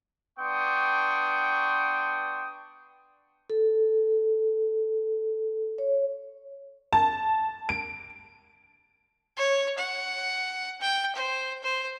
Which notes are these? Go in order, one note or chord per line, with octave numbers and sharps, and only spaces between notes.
B3 D4 G5 C6 C#6 D#6
A4
C#5
A5
D7
C#5
F#5
G5
C5
C5